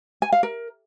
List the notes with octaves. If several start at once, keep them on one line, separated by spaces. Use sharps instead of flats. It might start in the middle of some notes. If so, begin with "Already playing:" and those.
G#5
F5
A#4